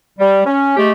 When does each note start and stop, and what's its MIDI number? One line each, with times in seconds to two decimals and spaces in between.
0.19 0.40 55
0.46 0.76 61
0.77 0.92 56
0.77 0.92 57
0.77 0.92 67